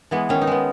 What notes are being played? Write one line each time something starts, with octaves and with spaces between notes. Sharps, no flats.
E3 G#3 B3
D#3 C#4
D#4
G#3 B3